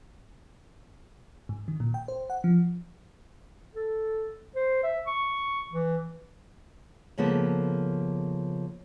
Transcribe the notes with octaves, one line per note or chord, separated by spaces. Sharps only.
G#2
D#3
A#2
G5
C5
F#5
F3
A4
C5
E5
C#6
E3
C#3 F3 A#3 B3 A4 A#4